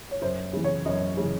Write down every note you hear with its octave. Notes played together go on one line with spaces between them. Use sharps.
C#5
F#2 C5
C#3 E3
C#5
F#2 D#5
C#3 E3